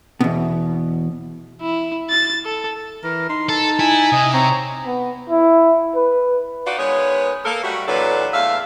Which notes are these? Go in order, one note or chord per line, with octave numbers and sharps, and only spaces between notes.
E2 B2
E4
A6
A4
E3 A#4
D#4 C6
A4 A5
E4 G#5
C3 D#5
C4 C#5 A#5
B3
E4
B4
D#4 F4 F#4 D5
D#3 G#3 B3 B4 C#5
A#3 A4 A#4
F#3 G3 A3 F#4
A#2 E3 F#3 D4 A4 B4
E2 A2 E5 F5